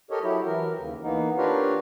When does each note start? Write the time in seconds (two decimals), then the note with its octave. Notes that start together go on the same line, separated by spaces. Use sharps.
0.10 G4 A4 A#4 C#5 D#5
0.23 F#3 E4 G4
0.47 E3 A#4
0.78 D#2 C#3
1.03 E3 A#3 B3 D#4
1.38 D4 F4 G4 A#4 B4 C#5